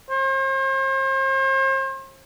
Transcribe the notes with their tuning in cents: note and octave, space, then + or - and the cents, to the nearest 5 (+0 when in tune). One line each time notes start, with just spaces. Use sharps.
C5 +40